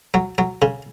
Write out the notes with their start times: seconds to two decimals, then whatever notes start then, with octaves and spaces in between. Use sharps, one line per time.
0.14 F#3
0.38 F#3
0.62 C#3